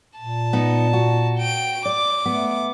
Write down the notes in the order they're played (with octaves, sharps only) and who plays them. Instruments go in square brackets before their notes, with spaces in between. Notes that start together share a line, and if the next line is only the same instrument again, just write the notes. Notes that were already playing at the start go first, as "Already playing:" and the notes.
[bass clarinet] A#2 [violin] A5
[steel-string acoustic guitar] B3 D#4
F#4
[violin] G5 D7
[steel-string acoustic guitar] D5 [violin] D6
[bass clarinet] A3 [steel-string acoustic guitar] B3